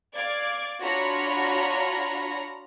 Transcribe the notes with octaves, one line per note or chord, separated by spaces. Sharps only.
D5 F5 G#6 D7
D4 F4 F#4 C#5 A#5 B5